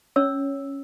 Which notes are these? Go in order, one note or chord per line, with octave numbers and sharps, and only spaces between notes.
C#4 C#5 E6